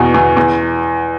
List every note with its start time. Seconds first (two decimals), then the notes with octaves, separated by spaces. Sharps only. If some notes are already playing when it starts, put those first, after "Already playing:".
Already playing: E2 B2
0.14 E2
0.37 E2